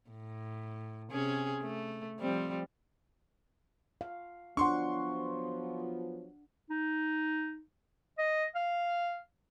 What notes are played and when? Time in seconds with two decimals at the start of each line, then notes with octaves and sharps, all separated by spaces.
0.10 A2
1.12 C3 C#4 G#4
1.63 A3
2.20 F3 G3 C4
4.01 F5
4.57 F3 F#3 B3 D4 F#5 C6 C#6
6.70 D#4
8.18 D#5
8.55 F5